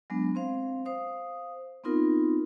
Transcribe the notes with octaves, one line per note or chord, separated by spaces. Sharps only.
F#3 G#3 B3 D4
C4 C5 F5
C5 F5 D#6
B3 C4 D#4 F4 A#4